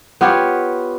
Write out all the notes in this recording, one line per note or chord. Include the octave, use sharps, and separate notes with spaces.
B3 F4 G4 C#5